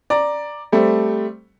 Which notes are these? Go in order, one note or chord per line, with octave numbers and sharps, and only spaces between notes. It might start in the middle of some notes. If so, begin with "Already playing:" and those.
D5 A#5
G3 A3 C4